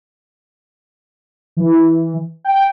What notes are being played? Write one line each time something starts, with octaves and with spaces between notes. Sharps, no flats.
E3
G5